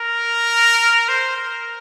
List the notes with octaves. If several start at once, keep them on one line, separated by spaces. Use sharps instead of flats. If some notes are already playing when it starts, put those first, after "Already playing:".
Already playing: A#4
C5
A#4